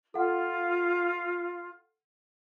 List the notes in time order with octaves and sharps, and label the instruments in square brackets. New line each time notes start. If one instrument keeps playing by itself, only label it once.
[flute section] F4 [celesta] A4 F#5